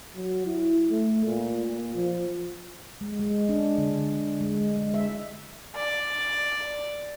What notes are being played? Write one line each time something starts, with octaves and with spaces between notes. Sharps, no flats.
F#3
E4
A3
A#2
A#2
F3
G#3
G#3
D4
D3
D3
G#3
G#3
E5
D5